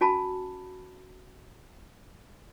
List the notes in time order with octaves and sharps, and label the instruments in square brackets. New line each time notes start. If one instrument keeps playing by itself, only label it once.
[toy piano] C#4 F#4 G#5 A5 B5